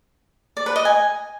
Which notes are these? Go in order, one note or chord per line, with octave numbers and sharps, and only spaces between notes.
D5
B4
D#5
G#5